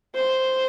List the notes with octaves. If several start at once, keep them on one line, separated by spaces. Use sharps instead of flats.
C5